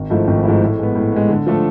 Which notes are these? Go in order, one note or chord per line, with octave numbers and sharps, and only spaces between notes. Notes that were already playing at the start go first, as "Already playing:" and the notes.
Already playing: G#1
G#2 F3 A3 E4
G#1
G#2 F3 A3 E4
A2
G#3 B3
A2
G#3 B3
D3
F3 A3 D4 A4